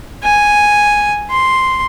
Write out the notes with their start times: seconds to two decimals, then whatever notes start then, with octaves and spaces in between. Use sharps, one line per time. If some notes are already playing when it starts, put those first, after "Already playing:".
0.23 G#5
1.31 C6